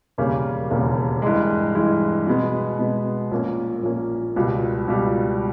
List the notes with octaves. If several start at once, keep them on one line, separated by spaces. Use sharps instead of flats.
E1 D#2 C#3 G3 A#3
E1 D#2 C#3 G3 A#3
G2 E3 G#3
G2 E3 G#3
B2 G#3 B3
B2 G#3 B3
A#1 A#2 A#3 C#4
A#1 A#2 A#3 C#4
C#2 B2 G3
C#2 B2 G3